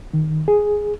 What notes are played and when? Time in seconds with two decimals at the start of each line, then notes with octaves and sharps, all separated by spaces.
0.13 D#3
0.48 G#4